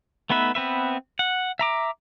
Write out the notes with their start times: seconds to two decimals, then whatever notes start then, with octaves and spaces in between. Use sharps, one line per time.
0.30 A3 B3 D#4 B4 E5
0.55 B3 C4 B4 E5
1.19 F#5
1.59 E5 A#5 D6